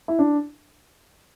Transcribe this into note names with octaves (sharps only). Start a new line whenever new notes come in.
E4
D4